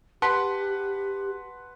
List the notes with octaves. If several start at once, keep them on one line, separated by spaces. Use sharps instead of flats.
G4 B4 F#5 A5 C6 B6